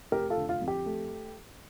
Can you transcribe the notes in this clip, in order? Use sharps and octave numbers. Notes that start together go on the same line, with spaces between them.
F1 G4 A#4
F4 A4
D3
F4
F2
G4
A3